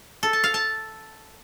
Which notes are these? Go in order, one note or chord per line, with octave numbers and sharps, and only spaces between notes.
A4
A5
F5
A5